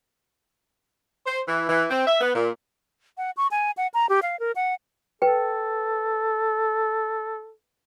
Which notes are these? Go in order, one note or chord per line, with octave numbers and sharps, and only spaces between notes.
C5
E3
E3
C4
E5
B3
A#2
F#5
C#6
G#5
F#5
A#5
G4
F5
A#4
F#5
A4 B4 G5